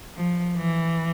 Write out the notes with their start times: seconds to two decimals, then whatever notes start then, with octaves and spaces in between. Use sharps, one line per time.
0.16 F3
0.56 E3